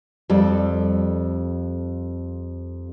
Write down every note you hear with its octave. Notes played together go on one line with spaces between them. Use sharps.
F2 G3 A4